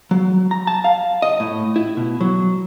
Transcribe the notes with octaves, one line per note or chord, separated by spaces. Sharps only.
F#3
A#5
A5
F5
D#5
A2
E4
B2
F#3